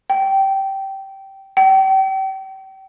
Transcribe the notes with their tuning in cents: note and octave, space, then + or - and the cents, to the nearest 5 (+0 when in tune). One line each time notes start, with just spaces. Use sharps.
G5 -15
G5 -35